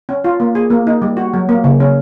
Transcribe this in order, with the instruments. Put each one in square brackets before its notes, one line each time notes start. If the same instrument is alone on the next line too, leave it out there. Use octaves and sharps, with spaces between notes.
[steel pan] C#4
F4
A#3
G#4
A#3
D#4
G3
F#4
F#3
A#3
C#3
C#4